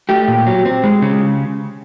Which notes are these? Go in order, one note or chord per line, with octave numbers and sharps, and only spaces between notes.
A3 G4
A#2
F#3
C4
G#3
C#3